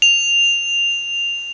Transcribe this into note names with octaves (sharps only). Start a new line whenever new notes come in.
F7